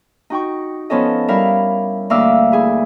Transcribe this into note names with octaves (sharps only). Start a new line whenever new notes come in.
D#4 F#4 G5 C#6
F3 B3 C#4 A4 D#5
G3 E4 A#4 F5
D2 A#3 E5 F5 D6 E6
E4 G#4